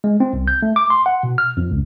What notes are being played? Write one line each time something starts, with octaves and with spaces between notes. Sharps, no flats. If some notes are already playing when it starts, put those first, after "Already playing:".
G#3
C4
C2
G6
A3
D6
C6
F#5
B2
F6
F2
C#2